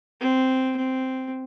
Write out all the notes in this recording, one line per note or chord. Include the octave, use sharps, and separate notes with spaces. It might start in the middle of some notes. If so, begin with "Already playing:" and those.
C4
C4